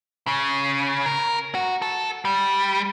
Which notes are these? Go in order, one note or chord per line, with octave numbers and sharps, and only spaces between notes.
C#3
A#4
F#4
A4
G3